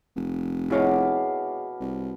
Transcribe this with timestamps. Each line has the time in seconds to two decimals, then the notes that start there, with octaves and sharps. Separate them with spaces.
0.16 F1
0.70 B2 E4 G#4 C#5 F5 D6
1.80 C2